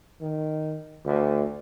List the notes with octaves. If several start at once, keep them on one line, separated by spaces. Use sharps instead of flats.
D#3
D2